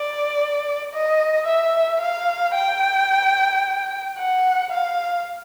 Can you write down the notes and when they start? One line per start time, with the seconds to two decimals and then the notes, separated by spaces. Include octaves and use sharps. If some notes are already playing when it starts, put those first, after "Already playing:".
Already playing: D5
0.94 D#5
1.47 E5
2.01 F5
2.55 G5
4.18 F#5
4.72 F5